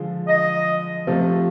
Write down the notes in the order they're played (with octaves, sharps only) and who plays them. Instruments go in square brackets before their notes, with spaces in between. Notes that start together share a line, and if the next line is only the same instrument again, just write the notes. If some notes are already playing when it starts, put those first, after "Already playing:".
Already playing: [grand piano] D3 F3 G#3
[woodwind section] D#5
[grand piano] C3 F3 A3